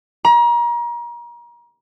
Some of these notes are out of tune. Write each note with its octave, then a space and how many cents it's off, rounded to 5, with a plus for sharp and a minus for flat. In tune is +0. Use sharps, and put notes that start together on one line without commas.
A#5 +35